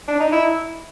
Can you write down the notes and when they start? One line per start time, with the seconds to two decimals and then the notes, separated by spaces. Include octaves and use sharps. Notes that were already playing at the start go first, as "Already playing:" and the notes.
0.08 D4
0.20 D#4
0.32 E4